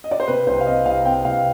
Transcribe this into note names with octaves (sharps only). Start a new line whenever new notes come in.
D#5
D5
C5
C3 B4
C2 C5
F5
C4 D#5
C2 F5
C4 G5
C2 F5